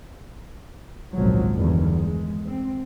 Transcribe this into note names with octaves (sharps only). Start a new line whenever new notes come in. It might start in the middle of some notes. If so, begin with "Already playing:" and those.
G#1 C#2 A#2 F3 F#3
E2 G2 D3 D#3
G#3
C4